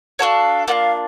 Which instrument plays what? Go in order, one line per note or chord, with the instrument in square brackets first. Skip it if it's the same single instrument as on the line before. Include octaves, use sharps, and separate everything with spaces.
[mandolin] D4 F#4 A4 C#5 [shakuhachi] F5 F#5
[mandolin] A#3 D4 F4 [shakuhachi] F5 F#5